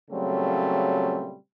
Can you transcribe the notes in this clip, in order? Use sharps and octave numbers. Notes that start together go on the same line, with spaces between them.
A#2 C#3 F#3 G3 A3 C4